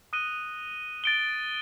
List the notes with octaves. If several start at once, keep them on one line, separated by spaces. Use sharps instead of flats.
D#6 F#6 A#6 D#7 G7
A6 D7 G7